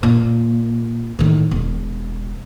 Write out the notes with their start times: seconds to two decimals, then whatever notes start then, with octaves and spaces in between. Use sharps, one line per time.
0.03 A#2
1.19 A2 D#3
1.51 E1